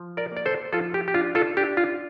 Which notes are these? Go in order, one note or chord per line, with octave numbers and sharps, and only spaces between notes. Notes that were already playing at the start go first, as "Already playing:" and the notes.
Already playing: F3
A#4 D5
A#3 D5
A4 C5
F3 F4 A4
G4
G4
D4 F4
F4 A4
D4 G4
F4